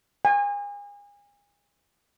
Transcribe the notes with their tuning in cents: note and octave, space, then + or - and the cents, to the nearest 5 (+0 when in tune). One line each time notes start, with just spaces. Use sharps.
G#5 -35